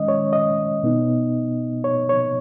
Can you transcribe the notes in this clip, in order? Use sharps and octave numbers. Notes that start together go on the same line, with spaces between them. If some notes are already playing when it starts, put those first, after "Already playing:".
Already playing: D#3 G#3 C#4 D#5
C#5
D#5
B2 B3 D#4
C#5
C#5